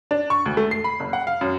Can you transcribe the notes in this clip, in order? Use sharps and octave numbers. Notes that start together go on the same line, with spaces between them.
D4
C#6
D2
A3
C7
B5
F#1
F#5
F5
F#2